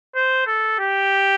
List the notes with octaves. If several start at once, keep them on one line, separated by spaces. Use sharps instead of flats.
C5
A4
G4